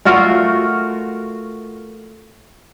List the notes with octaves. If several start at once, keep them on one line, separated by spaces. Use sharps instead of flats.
A3 F4 F#4 A#4